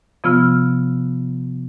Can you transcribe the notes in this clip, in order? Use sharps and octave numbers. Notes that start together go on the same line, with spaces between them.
C3 F3 B3 F4 E6 F6